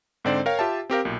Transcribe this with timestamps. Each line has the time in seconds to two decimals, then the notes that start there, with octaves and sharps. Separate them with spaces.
0.25 G#2 D3 C4 C5 D5
0.46 A#4 C#5 F5 G5
0.59 F4 G4 E5 A5
0.90 C4 G4 A#4 F5
1.05 B1 A#2